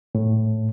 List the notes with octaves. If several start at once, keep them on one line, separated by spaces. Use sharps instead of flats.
A2